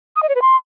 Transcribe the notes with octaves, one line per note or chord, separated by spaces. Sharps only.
D#6
D#5
C#5
B4
C6